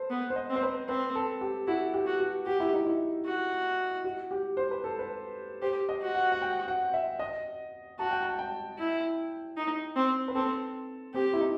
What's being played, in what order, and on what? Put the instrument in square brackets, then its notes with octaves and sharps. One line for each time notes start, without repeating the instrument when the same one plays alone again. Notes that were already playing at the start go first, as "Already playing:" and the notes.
Already playing: [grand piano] A4 B4 C5
[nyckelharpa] B3
[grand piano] C5
D#5
[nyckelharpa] C4
[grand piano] C5
B4
[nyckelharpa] C4 [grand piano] B4
[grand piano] A4
G4
[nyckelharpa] E4 [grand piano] F#4
[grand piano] G4
[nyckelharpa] F#4
[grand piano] F#4
[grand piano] F#4 [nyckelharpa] G4
[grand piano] E4
D#4
E4
[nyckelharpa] F#4
[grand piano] F#4
G4
C5
B4
A4
B4
[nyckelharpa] G4 [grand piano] C5
[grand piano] D#5
[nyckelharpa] F#4
[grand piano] F#5
F#5
G5
F#5
E5
D#5
[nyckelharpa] F#4 [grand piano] A5
[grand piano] G5
A5
G5
[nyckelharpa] E4
D#4
C4
[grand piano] B4
[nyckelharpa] C4 [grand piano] A4
[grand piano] C4 [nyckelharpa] G4
[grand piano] E4
D#4